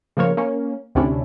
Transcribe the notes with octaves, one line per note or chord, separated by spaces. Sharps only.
C#3 F3 A#3 C#5
A#3 C#4
D2 C3 C#4 D4 E4